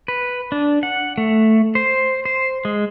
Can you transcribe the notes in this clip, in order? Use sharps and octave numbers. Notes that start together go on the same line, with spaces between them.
B4
D4
F#5
A3
C5
C5
G#3